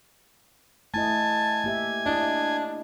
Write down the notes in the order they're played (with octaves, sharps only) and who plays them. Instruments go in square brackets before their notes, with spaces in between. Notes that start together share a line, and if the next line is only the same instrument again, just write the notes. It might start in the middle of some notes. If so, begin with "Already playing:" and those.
[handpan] A3 E4 D#5 [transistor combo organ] G#5 [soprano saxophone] A5
[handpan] A#3 G4 E5
[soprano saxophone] D4 [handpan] E4 D#5